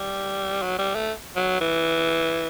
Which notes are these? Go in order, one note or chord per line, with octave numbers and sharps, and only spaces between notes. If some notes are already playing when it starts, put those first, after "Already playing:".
Already playing: G3
F#3
G3
A3
F#3
E3